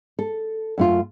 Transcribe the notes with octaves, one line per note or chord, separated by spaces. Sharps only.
A4
F#2 A3 F4